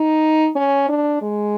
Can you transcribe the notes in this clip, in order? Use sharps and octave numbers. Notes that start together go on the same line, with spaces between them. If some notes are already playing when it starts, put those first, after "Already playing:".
Already playing: D#4
C#4
D4
G#3